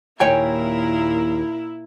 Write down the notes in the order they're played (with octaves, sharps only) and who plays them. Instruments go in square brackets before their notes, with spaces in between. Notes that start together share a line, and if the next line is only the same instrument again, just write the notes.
[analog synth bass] D#2 [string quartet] A#2 A#4 [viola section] E4 [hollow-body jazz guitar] C#5 G5 G#5